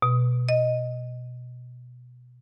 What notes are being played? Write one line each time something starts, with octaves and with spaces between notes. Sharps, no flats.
B2
D#5